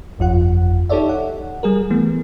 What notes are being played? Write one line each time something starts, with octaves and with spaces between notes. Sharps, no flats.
G1 F2 F4 F#5
D#4 G4 A4 C#5 D5 E5
F#5
G3 G#4 A#4
E3 A3 B3